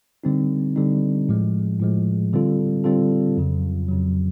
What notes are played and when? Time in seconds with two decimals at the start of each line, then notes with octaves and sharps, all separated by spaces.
0.24 D3 G3 C4 D#4
0.76 D3 G3 C4 D#4
1.29 A2 F3 G#3
1.80 A2 F3 G#3
2.33 D3 G3 C4 F4 A4
2.84 D3 G3 C4 F4 A4
3.37 F2 C#3 F#3
3.89 F2 C#3 F#3